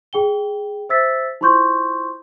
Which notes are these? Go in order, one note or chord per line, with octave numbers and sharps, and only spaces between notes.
G#4 G5 G7
C5 E5 E6 A6 B6
E4 F4 C5 C6 C#6 G6